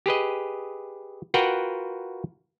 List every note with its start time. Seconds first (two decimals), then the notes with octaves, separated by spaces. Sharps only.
0.06 G4 G#4 B4 D#5
1.34 F4 F#4 A#4 B4 F#5 G5